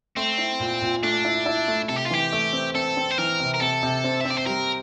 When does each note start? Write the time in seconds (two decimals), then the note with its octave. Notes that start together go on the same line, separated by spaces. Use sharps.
0.17 A3 C4
0.38 E4
0.60 A#2
0.82 A#2
1.03 A3 D4
1.25 E4
1.46 E4
1.68 A3
1.88 C3 A4
1.97 G4
2.06 F4
2.10 E3 G4
2.33 A3
2.53 C4
2.74 C4 A4
2.97 C4
3.11 C5
3.18 E3 A#4
3.40 C3
3.54 A#4
3.60 C3 A4
3.83 C3
4.04 C4
4.21 C4 E5
4.30 D5
4.38 C5
4.46 G3 A#4